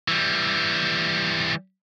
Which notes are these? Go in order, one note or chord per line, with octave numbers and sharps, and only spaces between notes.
E3 G3